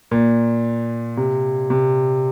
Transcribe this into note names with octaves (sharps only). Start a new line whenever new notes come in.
A#2
C3
C3